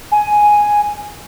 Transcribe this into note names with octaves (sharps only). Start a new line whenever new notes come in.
G#5